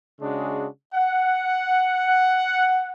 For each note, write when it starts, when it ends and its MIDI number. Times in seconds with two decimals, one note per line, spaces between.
0.20 0.67 49
0.20 0.67 56
0.20 0.67 62
0.20 0.67 66
0.20 0.67 68
0.94 2.92 78